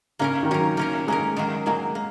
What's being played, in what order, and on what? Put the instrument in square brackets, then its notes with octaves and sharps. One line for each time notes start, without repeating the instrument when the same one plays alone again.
[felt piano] C#3 [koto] A#3 C#4 A#4
[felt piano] D#3
[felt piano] F#3 [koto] A#3 C#4 A#4
[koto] A#3 C#4 A#4
[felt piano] G#3 [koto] A#3 C#4 A#4
[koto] D#3 F#3 A#3
[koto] D#3 F#3 A#3 [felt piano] G#3
[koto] A#3